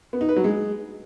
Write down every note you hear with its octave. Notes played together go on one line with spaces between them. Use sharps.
B3
D#4
B4
F#3
G#3